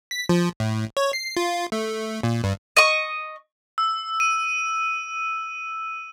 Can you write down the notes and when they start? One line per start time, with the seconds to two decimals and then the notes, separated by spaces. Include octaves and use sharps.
0.11 B6
0.29 F3
0.60 A2
0.97 C#5
1.13 C7
1.37 F4
1.72 A3
2.23 A#2
2.44 G2
2.77 D#5 C#6
3.78 E6
4.20 D#7